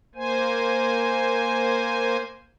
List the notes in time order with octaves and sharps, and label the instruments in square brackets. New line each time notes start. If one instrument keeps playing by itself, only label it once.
[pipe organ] A#3 C5 G#5